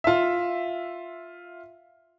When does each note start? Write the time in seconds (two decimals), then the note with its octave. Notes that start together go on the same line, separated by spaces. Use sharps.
0.04 F4 E5